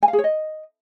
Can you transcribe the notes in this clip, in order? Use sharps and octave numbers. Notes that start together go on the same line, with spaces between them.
G#5
F5
G#4
C#5
D#5